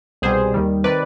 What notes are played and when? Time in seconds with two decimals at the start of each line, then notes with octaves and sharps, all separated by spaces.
0.22 C2 B2 G3 G#4 C5
0.54 D#2 D#3 G3
0.84 C3 D#3 B4 D5